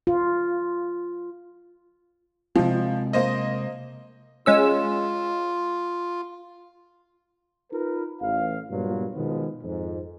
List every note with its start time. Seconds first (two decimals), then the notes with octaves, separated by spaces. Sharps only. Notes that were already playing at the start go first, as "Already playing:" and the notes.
0.07 F4
2.56 C3 F3 G#3 C4
3.13 A#3 C5 D#5
4.46 G#3 C#4 F4 E6
7.72 D#4 F4 A#4 B4
8.21 A1 F5
8.70 G2 A#2 F#3 B3 F4
9.15 B2 D#3 F3 G#3 B3
9.63 F2 G#2